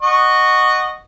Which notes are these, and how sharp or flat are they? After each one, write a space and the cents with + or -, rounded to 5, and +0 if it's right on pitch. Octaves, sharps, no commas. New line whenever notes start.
D#5 -20 F#5 +0 C#6 +0